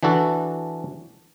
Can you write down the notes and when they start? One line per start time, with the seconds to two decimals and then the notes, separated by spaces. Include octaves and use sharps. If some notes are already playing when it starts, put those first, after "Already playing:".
0.03 E3 D4 F#4 A4